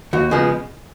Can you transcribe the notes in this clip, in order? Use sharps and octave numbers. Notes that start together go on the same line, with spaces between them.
D#2 F#4
C#3 F3 G#3 B3